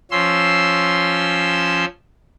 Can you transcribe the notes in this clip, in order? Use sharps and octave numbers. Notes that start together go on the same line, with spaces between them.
F3 C#4 C6 E6